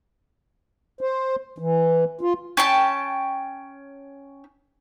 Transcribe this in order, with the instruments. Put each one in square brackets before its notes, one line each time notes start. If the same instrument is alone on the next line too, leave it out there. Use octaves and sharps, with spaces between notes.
[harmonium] C5
E3
F4
[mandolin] C#4 G5 A5